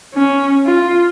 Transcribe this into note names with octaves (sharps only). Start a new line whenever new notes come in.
C#4
F4